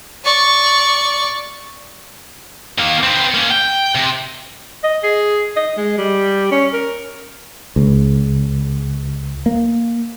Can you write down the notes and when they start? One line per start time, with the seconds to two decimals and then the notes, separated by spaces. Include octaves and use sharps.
0.25 D5 C#6
2.78 D#3 A#3
3.03 B3 C4
3.35 A#3 C#4
3.52 G5
3.95 C3
4.84 D#5
5.04 G#4
5.57 D#5
5.77 G#3
5.98 G3
6.51 C#4
6.74 A#4
7.76 C#2
9.46 A#3